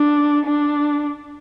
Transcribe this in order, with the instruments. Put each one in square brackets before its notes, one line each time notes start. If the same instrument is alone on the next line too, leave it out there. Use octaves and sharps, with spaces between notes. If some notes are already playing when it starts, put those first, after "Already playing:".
Already playing: [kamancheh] D4
D4